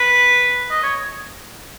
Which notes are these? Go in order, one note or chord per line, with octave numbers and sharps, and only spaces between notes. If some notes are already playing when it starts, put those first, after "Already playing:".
Already playing: B4
D#5
C#5